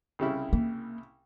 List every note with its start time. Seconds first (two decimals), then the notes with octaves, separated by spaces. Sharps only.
0.19 C2 C#3 E4
0.53 A#3